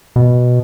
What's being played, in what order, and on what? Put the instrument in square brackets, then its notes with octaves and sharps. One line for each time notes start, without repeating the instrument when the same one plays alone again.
[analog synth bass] B2